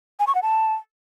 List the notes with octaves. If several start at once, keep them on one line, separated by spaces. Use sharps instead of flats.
G#5
C#6
F#5
A5